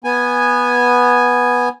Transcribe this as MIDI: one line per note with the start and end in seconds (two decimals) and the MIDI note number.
0.04 1.69 59
0.04 1.69 80